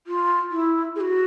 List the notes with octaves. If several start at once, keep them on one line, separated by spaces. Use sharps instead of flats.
F4
E4
G#4
F#4